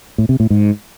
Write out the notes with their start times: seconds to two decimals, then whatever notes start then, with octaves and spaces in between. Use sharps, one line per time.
0.18 A2
0.29 C3
0.40 A2
0.50 G#2